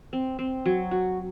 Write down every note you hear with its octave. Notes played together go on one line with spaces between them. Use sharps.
C4
C4
F#3
F#4